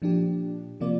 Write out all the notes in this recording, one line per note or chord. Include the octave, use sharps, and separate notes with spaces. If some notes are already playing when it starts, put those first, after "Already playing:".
A#2 F3 D4 G4
C3 F3 A#3 F4 D5